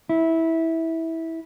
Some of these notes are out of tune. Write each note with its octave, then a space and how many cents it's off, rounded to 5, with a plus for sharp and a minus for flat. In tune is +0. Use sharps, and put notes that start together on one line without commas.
E4 -15